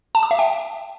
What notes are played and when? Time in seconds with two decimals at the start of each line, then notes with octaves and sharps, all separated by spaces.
0.15 A5
0.23 D6
0.31 E5
0.39 G5